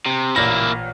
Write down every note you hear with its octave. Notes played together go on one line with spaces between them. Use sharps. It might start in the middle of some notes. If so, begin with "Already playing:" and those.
C3
A1 A#2 A#3 E4 A#6